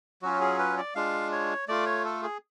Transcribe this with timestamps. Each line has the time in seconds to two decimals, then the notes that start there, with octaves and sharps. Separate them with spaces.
0.22 F#3 C#4 F4 F#4
0.41 G#4
0.59 B4
0.77 D5
0.95 G#3 D4 F4 F5
1.32 C#5
1.68 A3 F4 D5
1.86 C#5
2.05 A4
2.23 G#4